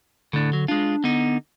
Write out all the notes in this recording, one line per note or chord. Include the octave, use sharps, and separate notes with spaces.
A2 D3 D4
F#3
G#3 D4 F4
D3 B3 D#4